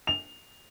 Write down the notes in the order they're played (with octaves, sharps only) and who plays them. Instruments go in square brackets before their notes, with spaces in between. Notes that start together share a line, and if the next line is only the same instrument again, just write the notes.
[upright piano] F7